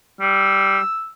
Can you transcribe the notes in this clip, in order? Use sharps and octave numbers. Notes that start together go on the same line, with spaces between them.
G3 E6